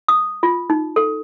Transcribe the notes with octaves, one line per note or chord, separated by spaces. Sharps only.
D#6
F4
D#4
A4